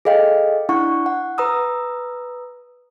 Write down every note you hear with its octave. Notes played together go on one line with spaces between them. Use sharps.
G#4 A4 D#5 F5 G5
D4 E4 F#5 C#6
F#5
B4 A#5 D#6 E6